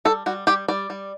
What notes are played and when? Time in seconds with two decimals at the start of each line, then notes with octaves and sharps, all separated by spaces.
0.05 G3 A4
0.26 G3 F#4
0.47 G3 G4
0.68 G3 D5
0.90 G3